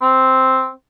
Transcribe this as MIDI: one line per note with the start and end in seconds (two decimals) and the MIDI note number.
0.01 0.70 60